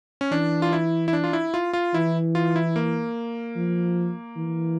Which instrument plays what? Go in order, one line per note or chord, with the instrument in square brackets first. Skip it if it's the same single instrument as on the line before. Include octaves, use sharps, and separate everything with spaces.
[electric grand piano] C#4
[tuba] E3 [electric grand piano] D4
[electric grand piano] F4
E4
E4
D4
F4
E4
F4
F4
[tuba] E3 [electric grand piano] E4
[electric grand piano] F4
E4
A#3
[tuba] F3
E3